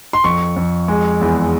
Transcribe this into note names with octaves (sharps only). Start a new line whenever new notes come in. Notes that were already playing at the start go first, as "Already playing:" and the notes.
C6
F2 C#6
F2
G#3
E2